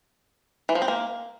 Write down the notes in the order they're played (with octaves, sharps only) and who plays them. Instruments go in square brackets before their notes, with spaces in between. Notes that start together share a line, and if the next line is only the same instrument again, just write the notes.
[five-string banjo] E3
F3
C4
A#3